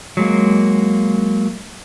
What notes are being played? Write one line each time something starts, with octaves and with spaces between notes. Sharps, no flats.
F#3 G#3 A#3